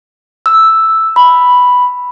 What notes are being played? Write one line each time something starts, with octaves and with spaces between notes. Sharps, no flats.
E6
B5